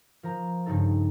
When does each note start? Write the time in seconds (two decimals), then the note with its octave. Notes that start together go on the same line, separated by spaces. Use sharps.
0.23 F3 A#4 A#5
0.66 G2 C#3 G3 D#4 A4